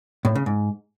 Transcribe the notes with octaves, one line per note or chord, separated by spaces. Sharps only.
A2
C#3
G#2